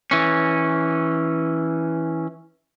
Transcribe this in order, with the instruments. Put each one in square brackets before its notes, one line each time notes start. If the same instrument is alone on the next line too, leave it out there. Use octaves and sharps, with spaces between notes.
[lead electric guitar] E3 C#4